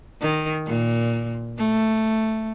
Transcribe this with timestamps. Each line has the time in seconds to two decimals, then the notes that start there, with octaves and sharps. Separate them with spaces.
0.22 D#3
0.67 A#2
1.58 A3